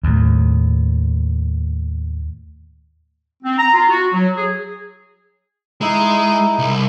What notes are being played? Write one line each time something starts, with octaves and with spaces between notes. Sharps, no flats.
D#2 A2
C4
A#5
F4
F#4
F#3
G#4
G#3 D#4 E4
C2